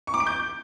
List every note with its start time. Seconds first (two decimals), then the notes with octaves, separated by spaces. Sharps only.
0.07 C#6
0.14 D6
0.20 D7
0.27 G6